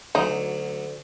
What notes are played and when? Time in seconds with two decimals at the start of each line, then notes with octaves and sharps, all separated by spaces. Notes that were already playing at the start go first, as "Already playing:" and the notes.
0.15 D2 F#3 D#4